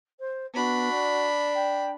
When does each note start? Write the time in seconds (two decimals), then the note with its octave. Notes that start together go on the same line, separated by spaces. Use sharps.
0.19 C5
0.54 B3 D4 F#4 B5
0.93 D5
1.54 G5